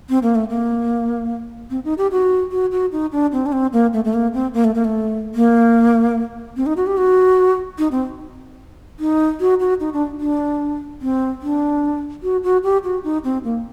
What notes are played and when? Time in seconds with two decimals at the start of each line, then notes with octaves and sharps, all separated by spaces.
0.09 C4
0.23 A#3
0.35 A3
0.49 A#3
1.70 C4
1.85 D#4
1.98 G4
2.11 F#4
2.52 F#4
2.72 F#4
2.92 D#4
3.12 D4
3.32 C4
3.46 D4
3.53 C4
3.73 A#3
3.93 A3
4.05 A3
4.13 A#3
4.34 C4
4.54 A#3
4.64 A3
4.74 A#3
4.85 A3
5.35 A#3
6.57 C4
6.66 D#4
6.77 F#4
6.87 G4
6.97 F#4
7.78 D#4
7.92 C4
9.00 D#4
9.40 F#4
9.60 F#4
9.80 D#4
9.93 D4
10.21 D4
11.02 C4
11.42 D4
12.23 F#4
12.43 F#4
12.64 G4
12.84 F#4
13.04 D#4
13.24 C4
13.44 A#3